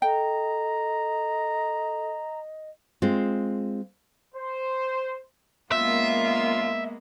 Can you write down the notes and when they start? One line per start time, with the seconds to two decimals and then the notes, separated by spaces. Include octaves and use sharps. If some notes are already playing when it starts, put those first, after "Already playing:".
0.02 A4 D#5 G5 A#5
3.02 G#3 C4 F4
4.35 C5
5.72 F#2 G#3 A#3 B3 F4 E5